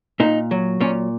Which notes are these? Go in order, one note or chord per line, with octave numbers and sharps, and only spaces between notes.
A#2 D#4
F#3
A#2 C#4